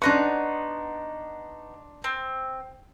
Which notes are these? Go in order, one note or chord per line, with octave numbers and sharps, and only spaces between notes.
B3 D4 D#4 C6 C#6 F#6
C4